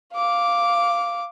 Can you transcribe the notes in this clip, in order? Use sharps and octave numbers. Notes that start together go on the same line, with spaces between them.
F5 D6